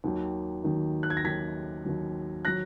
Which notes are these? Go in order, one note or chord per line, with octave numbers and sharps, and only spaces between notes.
D#2 D#3 F#3
D#2 D#3 F#3
F#6
G#6
A#6
D#2 D#3 F#3 G#6 B6
D#2 D#3 F#3
D#3 F#3 F#6 A#6